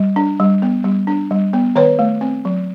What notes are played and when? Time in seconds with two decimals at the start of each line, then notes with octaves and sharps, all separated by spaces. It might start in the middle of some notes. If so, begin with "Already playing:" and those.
Already playing: G3
0.16 D4
0.40 G3
0.62 B3
0.84 G3
1.07 D4
1.31 G3
1.53 B3
1.75 D#3 B4 C#5
1.99 A3
2.21 C4
2.45 F#3